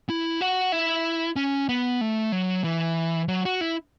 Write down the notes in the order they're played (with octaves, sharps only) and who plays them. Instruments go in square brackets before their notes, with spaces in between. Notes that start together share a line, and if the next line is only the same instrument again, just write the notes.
[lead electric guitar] E4
F#4
E4
C#4
B3
A3
F#3
E3
F#3
F#4
E4